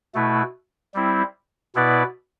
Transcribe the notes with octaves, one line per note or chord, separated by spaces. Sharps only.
B2 A3 E4 B4
G3 C4 E4
B2 B3 E4 B4 D5